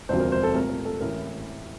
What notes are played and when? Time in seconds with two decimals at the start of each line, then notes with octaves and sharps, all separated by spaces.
0.09 E1 D2 C3 F3 C5
0.20 A#4
0.32 C5
0.43 A4
0.54 C2 A#2 A3 A#4
0.70 A#4
0.85 A4
1.00 A1 A2 E3 A#4